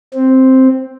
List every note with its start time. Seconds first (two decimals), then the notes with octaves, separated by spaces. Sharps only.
0.14 C4